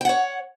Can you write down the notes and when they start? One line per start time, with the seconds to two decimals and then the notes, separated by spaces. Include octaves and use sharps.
0.01 G5
0.05 F#5
0.09 C#5